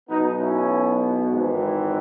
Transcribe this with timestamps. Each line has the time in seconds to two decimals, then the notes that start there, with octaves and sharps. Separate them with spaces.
0.09 B1 B2 B3 D#4
0.39 C#4 E4
1.29 G#1 G#2 E3